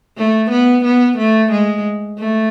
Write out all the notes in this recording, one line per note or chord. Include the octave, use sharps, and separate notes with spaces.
A3
B3
B3
A3
G#3
A3